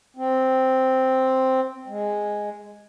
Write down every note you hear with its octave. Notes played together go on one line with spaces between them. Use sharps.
C4
G#3